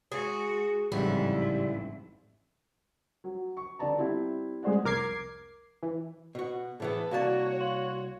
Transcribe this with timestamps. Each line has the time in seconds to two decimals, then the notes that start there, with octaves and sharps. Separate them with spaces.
0.12 G#3 F#4 G#4
0.92 A1 F2 G#2 C#3 G3 E4 F#5
3.24 F#3
3.57 C#6
3.79 D3 B3 D5 A5 A#5
3.98 G3 C4 E4 E5
4.63 G#3 G#4 C5 D5 F#5
4.84 C2 F2 A#4 D6 G#6 C7
5.83 E3
6.35 B2 F#4
6.80 A2 E3 B3 G#4 A4 B4
7.11 C2 A#3 F#4 C#5 D5 F5 A5
7.60 F5 C6 F#7